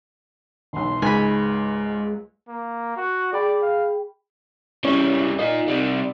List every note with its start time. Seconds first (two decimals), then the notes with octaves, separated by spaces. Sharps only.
0.73 E1 B1 C6
1.02 C#2 G#2 G#3 G#5 B5
2.49 A#3
2.97 F#4
3.33 G#4 D5 G5 B5
3.62 F5
4.85 E3 G3 C#4
5.39 A#3 D#4 F4
5.68 C3 G3